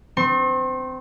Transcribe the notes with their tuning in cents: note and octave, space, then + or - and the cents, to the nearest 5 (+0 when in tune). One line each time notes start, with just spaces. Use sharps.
C4 -25 C6 +45